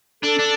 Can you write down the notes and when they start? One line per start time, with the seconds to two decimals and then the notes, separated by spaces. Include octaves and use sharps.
0.23 D4 A4
0.39 D4